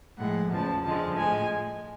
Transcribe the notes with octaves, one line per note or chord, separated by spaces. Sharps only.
A2 F3 G#3 F#5
E2 C#3 F3 A5
F2 D3 F3 G#3 A5
A2 F3 G#3 G#5